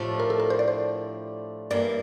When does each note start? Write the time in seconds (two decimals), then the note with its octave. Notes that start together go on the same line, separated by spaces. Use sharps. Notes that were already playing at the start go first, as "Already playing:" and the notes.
Already playing: A2 F3 A3 D4 G4
0.20 A#4
0.30 A4
0.40 A#4
0.50 C5
0.59 D5
0.68 C5
1.70 G2 E3 A#3 D5